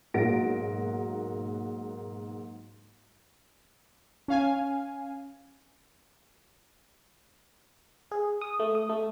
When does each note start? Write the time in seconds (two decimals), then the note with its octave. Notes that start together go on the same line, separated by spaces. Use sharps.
0.14 B1 G#2 A#3 F#4 A#6 D7
4.28 C#4 F5 G#5
8.11 G#4
8.41 D#6
8.60 A3
8.75 D#6
8.89 A3